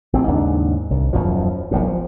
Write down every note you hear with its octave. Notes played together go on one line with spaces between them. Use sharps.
A1 C4
D#2 G#2 C#3 D4
C2
D#1 F#2 B2 F3
E1 B1 A2
F3